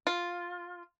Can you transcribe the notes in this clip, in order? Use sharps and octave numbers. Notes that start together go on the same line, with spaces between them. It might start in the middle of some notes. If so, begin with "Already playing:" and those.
F4